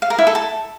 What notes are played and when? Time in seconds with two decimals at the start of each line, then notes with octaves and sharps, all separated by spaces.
0.02 F5
0.10 A#4
0.18 E4
0.27 A4
0.35 A5